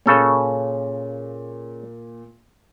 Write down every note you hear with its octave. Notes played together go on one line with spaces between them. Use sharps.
A#2 C#3 A4 C#5